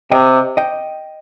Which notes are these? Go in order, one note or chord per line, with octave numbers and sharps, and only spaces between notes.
C3 D#5 G5
D#5 G5